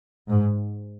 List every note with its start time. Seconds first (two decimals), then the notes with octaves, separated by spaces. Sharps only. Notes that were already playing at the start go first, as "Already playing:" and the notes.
0.28 G#2